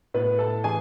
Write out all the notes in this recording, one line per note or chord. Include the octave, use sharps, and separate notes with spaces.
A2 B3 B4
A2 A4 A5
E3 G#4 G#5